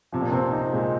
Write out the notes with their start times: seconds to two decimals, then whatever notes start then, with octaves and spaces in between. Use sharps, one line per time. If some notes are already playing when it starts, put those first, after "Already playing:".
0.13 C3 F3
0.22 A#2
0.31 C3 C4
0.52 D#4
0.72 A#2 G#3